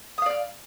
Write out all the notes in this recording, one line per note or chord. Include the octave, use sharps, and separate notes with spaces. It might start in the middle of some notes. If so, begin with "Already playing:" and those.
D5 F5 D#6 F6